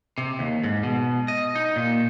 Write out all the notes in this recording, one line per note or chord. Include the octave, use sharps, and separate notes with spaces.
C3
D#2
G#2
B2
D#5
D#4
A#2